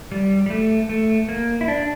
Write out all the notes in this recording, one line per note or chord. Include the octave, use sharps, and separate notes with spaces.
G3
G3
A3
A3
A#3
E4
D4